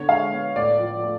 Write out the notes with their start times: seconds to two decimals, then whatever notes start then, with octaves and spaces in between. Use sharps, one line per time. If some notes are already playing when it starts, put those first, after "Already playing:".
Already playing: D3 B3 C#5
0.09 G#3 F5
0.32 B3
0.56 A2 D5
0.79 F3
1.03 A3